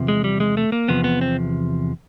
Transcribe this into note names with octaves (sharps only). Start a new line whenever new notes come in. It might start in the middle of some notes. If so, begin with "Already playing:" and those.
Already playing: E2 C3 F3
G#3
G3
G#3
A3
A#3
E2 C3 F3 B3
B3
C4